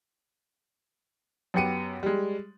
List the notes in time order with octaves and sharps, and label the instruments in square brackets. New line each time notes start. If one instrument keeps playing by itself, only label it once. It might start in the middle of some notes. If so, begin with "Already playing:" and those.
[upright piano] F#2 B3 G4 C#7 D#7
G3 G#3